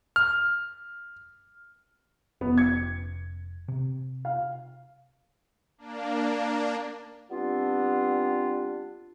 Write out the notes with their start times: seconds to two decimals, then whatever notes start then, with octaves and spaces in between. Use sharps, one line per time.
0.16 F6
2.41 F1 B3 C#4
2.58 G#6 C#7
3.68 C3
4.25 F5
5.78 A#3 D4
7.31 G3 B3 C4 D4 F4